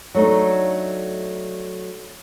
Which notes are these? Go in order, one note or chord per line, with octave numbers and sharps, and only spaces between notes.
F#3 A3 D4 D#4